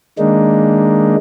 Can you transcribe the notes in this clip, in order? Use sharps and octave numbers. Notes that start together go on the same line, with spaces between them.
D#3 G#3 A#3 D4 D#4